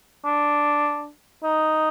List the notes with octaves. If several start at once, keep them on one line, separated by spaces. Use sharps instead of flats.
D4
D#4